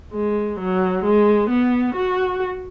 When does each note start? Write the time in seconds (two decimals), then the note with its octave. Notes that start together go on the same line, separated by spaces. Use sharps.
0.13 G#3
0.60 F#3
1.05 G#3
1.50 B3
1.95 F#4